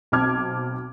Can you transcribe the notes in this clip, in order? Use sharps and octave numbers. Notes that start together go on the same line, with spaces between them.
B1 C4 A5 D6 F6 G#6